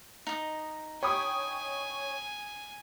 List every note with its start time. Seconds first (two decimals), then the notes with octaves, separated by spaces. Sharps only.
0.27 D#4 D#5
1.03 C#5 G5 G#5 B5 D#6